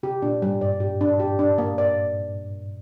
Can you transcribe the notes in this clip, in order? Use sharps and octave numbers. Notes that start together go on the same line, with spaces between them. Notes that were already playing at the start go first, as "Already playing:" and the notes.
C3 G4
A#2 D4
G#2 G3
G2 D5
G4
D4
G4
D4
A#3
D5